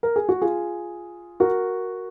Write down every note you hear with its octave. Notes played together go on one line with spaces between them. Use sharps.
A#4
G#4
F#4
F4 G#4
F#4 A#4